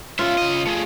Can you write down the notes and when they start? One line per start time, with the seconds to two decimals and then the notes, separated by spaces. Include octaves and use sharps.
0.19 C#4 F4 E5
0.38 C#3 D#5
0.67 A3 G#4